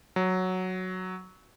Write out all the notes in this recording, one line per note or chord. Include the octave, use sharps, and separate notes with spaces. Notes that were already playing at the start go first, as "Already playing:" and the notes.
F#3